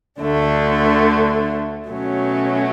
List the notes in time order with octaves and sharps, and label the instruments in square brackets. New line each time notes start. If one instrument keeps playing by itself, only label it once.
[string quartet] D2 D3 A3 D4
B2 F#3 A3 C#4